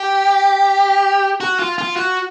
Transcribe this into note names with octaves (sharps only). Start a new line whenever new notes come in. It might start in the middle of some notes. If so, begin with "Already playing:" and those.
Already playing: G4
F#4
F4
F4
F#4